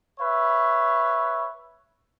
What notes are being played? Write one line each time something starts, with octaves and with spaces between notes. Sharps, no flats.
B4 C#5 E5